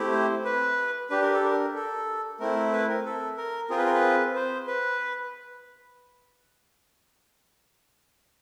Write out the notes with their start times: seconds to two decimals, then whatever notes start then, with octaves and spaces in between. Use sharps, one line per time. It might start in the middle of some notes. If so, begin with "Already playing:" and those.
Already playing: A3 C4 E4 G4
0.12 C5
0.45 B4
1.10 D4 G4 B4
1.22 A#4
1.34 A4
1.45 A#4
1.76 A4
2.40 A3 C4 E4 A#4
2.73 B4
2.89 A#4
3.05 A4
3.37 A#4
3.70 C4 F4 G#4 A#4
3.78 B4
3.86 A#4
3.94 B4
4.35 C5
4.67 B4